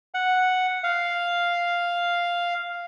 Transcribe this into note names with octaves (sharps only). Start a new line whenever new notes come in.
F#5
F5